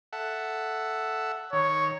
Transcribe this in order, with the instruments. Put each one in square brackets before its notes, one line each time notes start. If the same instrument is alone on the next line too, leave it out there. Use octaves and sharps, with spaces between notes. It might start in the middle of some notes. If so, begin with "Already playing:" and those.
[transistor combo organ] A4 E5 F#5
[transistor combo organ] D#3 [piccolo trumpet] C#5